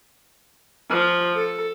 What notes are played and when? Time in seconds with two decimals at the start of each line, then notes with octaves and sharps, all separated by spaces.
0.91 F3
1.36 A4